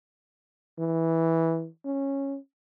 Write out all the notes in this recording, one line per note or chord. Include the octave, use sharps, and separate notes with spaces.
E3
C#4